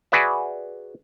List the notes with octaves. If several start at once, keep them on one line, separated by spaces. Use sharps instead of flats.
F#4 G#4 B4 D5 E5